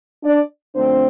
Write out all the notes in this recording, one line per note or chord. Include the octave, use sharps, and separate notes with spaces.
D4 D5
F2 D3 A3 C4 D4 C5